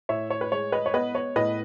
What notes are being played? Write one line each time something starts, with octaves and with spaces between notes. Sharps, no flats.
A2 C#5 E5
C#5
B4
G#3 C#5
B4 D#5
C#5
B3 B4 D#5
C#5
A2 B4 D#5